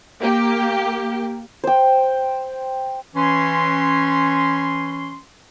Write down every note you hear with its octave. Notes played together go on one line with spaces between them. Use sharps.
A#3 G4
C5 G5
E3 C#4 C6